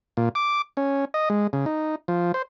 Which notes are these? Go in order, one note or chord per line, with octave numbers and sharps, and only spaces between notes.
A#2
D6
C#4
D#5
G#3
C#3
D#4
F3
C5